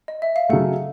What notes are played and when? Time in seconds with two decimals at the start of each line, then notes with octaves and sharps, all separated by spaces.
0.08 D#5
0.22 E5
0.36 F5
0.49 C#3 F#3 A3 F#5